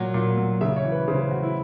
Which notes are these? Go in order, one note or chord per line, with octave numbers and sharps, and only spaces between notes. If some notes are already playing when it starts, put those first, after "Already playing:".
Already playing: A#2 F#3
A#2
F#3
C#3 E5
C#5
E3
B4
C#3 C5
C5
E3 F#4
E4